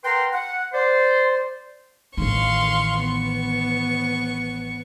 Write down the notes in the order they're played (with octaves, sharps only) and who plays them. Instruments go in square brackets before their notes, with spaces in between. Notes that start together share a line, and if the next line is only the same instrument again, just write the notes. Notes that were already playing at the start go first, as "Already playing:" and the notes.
[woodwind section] A#4 B4 F#5 G5 A#5 C6
F#5
C5 D5 C6
[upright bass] A1 D#3 [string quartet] F5 C6 C#6
[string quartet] B3 C#6